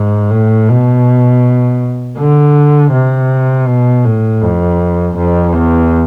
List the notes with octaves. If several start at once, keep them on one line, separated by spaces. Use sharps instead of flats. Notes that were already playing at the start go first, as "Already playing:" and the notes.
Already playing: G#2
A2
B2
D3
C3
B2
A2
F2
F2
E2